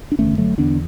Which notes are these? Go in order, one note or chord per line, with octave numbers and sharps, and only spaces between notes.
D4
F#1 E2 D3 A3 C#4
F#3 A3
E2 D3 B3 D4